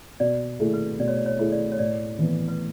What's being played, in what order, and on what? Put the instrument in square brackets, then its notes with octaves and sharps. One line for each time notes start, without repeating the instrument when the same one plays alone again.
[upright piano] B2 [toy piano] D5
[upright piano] A3 E4 G#4
[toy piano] B4
[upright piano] B2 [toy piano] D5
[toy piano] C#5
D5
C#5
[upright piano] A3 E4 G#4
[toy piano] D5
C#5
[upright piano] A2 [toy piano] D5
[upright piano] E3 B3
[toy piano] B4